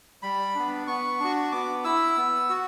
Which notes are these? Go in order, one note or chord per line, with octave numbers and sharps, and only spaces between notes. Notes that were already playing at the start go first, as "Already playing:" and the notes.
G3 B5
B3 D4
B3 C#6
D4 F#4
B3 D6
E4 E6
B3
F#4